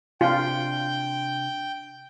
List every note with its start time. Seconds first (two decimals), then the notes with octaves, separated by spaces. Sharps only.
0.21 C3 D4 F4 G5